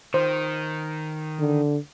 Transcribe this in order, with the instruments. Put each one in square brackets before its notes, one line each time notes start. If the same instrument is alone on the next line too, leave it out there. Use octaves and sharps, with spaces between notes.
[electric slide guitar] D#3 [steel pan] C5
[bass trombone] D3